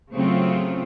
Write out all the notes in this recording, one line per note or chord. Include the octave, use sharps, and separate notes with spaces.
C#3 F#3 A3 C4 F4